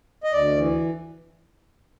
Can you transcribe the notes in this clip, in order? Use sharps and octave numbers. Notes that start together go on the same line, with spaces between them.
D#5
D2 D5
E3